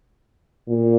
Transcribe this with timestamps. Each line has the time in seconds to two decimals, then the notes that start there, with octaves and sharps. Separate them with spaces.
0.68 A#2